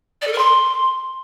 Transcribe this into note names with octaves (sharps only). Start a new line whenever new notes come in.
D5
A4
A#4
C6